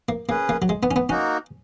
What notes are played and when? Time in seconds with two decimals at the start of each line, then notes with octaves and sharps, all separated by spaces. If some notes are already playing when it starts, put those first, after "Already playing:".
0.09 A#3
0.29 A#3 C#4 G#4 B4
0.49 A#3
0.62 F#3
0.69 G#3
0.83 B3
0.91 C#4
0.96 B3
1.09 A#3 C#4 D#4 F#4